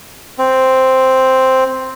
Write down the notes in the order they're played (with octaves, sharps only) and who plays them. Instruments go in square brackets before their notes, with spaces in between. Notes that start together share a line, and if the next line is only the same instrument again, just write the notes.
[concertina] C4